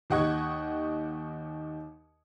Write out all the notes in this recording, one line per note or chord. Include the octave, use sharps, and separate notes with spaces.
D#2 G4 D#5 F#5 C#6 G#6